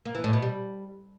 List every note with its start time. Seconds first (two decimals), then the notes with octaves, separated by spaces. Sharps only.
0.05 A#3
0.15 E3
0.24 A2
0.33 B2
0.42 G3